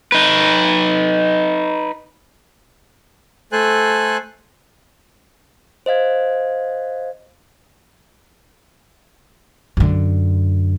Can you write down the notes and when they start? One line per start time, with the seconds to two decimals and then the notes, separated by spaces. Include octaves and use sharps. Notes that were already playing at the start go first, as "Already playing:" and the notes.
0.12 D#4 B4
3.52 A3 A4 C5 G#5 F#6
5.86 C5 D#5 F5 G#6
9.77 F#2 D3